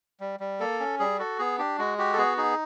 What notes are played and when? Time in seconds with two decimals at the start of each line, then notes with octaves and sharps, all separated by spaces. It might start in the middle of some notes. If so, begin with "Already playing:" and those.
0.20 G3
0.40 G3
0.60 A#3 A4
0.80 C#4
0.99 G3 G#4
1.19 F#4 A4
1.39 B3 G#4
1.58 D4 G4
1.78 G#3 F#4
1.98 F#4 G4
2.13 A4
2.18 B3 G#4
2.37 D#4 G#4